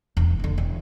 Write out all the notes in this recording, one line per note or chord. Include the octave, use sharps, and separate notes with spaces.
E1
D3 F3
E1